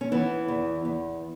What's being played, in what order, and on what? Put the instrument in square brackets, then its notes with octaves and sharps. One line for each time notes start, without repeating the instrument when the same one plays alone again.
[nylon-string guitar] C#4
E3 B3 E4
E2
E2